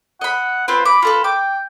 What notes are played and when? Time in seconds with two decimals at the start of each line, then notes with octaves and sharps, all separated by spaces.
0.21 D#5 F#5 B5
0.68 C4 F4 B4 C5
0.85 B5 D6
1.02 F4 A4 B4
1.24 G5 D6